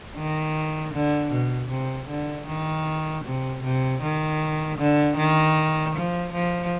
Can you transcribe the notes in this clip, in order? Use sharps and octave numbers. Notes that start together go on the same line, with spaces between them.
D#3
D3
B2
C3
D3
D#3
C3
C3
D#3
D3
D#3
F3
F3